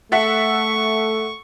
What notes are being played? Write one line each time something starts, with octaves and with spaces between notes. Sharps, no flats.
A3 A4 E5 F#5 C#6